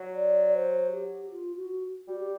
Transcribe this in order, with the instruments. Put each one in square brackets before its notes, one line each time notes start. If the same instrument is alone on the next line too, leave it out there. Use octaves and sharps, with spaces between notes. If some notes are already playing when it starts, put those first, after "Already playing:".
Already playing: [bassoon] F#3
[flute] D5
C5
G4
F4
F#4
[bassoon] G3 [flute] F#4
[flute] G4